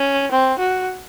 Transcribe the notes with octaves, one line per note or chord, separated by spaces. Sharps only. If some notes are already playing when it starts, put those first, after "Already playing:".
Already playing: C#4
C4
F#4